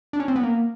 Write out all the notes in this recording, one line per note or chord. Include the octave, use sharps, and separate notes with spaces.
D4
C#4
C4
B3
A#3